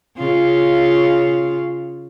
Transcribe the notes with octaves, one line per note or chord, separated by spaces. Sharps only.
C#3 F4